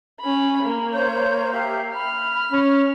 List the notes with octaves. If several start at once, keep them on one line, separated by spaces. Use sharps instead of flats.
C#4 B5
A#3
C5 C#5 G6
G4 E5 F5
B5 F6
C#4